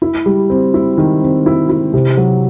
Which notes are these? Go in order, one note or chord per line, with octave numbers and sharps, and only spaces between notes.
E4
G3
C4
E4
D#3
C4
E4
E4
C3
F#3